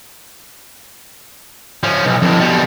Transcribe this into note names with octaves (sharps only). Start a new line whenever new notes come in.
F3 C#4
B1
F2 A2
B2 G3